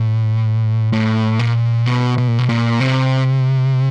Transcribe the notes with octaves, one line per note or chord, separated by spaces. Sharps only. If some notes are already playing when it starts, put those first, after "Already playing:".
Already playing: A2
A2
A#2
B2
B2
A#2
B2
A#2
C3